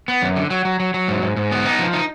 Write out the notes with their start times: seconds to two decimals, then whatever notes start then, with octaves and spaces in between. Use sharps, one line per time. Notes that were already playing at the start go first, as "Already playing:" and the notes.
0.08 B3
0.22 F#2
0.36 D3
0.50 F#3
0.65 F#3
0.80 F#3
0.94 F#3
1.08 G#2
1.22 G#2
1.36 G#2
1.51 B3
1.65 D#4
1.79 F3
1.93 D#4